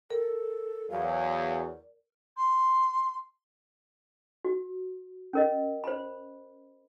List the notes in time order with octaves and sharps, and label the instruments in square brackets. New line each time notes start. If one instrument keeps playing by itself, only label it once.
[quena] A4 [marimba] A#4
[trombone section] E2 F#3 [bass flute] D5 [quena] F5
[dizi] C6
[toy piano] F#4
C#4 A#4 D#5
C5 B5